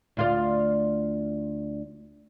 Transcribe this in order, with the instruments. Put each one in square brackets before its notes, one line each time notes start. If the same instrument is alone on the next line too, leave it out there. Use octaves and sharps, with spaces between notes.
[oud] D2 F4 D5